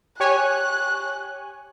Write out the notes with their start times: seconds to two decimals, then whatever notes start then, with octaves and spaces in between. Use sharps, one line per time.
0.20 G4 C#5 G#5 F#6